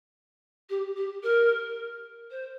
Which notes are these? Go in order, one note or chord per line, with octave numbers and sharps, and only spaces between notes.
G4
G4
A#4
C5